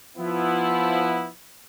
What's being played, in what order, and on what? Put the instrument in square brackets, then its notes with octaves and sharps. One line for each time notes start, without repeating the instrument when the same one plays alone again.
[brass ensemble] F3 B3 E4